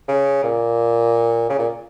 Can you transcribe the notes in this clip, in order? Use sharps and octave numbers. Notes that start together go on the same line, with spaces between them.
C#3
A#2
C#3
A#2